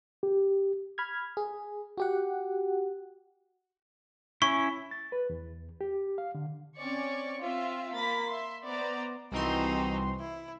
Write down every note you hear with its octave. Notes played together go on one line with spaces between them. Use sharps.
G4
B5 F6 G#6
G#4
F#4 G4 F#5
C#4 E4 C#6
A6
B4
E2
G4
F5
D3
C4 C#4 C#5 D5 C#6
C4 F4 E5
A#3 B5 A6 B6
E5 C6
B3 C5 D5 A#5
C2 E3 C4 D#4 F#4 C6
E4